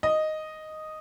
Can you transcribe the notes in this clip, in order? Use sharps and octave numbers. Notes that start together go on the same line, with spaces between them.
D#5